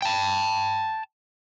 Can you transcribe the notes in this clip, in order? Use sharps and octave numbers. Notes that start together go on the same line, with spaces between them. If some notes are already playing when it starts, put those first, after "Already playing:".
G5 A5